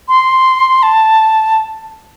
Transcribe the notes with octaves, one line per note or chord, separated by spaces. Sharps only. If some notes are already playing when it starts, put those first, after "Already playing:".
C6
A5